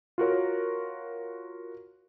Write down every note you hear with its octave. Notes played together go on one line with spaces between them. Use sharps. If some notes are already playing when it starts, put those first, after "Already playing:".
F4 F#4 A#4 C#5